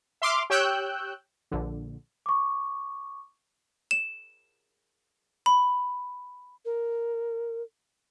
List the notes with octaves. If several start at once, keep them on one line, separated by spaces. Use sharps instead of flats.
E5 C6 D6 F6
G4 C#5 G5 E6 F#6 G6
A#1 D3
C#6 D6
E7
B5
A#4